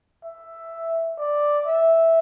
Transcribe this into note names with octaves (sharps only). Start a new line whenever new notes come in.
E5
D5
E5